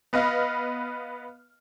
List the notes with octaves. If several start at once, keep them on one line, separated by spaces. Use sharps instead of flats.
B3 B4 D#5 F5 F6